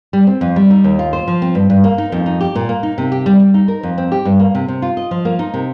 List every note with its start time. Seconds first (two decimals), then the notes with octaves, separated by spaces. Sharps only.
0.13 G3
0.27 C4
0.41 F2
0.56 G3
0.70 D#4
0.84 D#2
0.99 F4
1.13 C5
1.28 F3
1.42 C4
1.55 G2
1.70 G2
1.84 A#3
1.98 D#4
2.12 F2
2.26 D#4
2.41 G4
2.55 A#2
2.69 A#3
2.83 D#4
2.98 C3
3.12 G4
3.26 G3
3.40 G3
3.54 D#4
3.68 A#4
3.83 F2
3.98 C4
4.12 G4
4.25 G2
4.39 A#3
4.55 C3
4.68 C3
4.82 F4
4.97 D#5
5.11 F3
5.25 A#3
5.39 D#4
5.54 C3